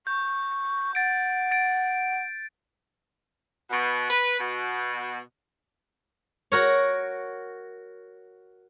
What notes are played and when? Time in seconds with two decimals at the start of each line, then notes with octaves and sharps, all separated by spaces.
0.07 C#6 G6
0.95 F#5 A6 D7
1.51 A6 D7
3.69 B2
4.09 B4
4.38 B2
6.52 F#4 A#4 C#5